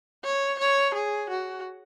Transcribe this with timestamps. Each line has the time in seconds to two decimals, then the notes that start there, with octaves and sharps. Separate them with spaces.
0.25 C#5
0.59 C#5
0.95 G#4
1.30 F#4